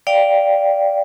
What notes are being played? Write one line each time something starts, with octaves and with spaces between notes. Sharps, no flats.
D5 F5 G5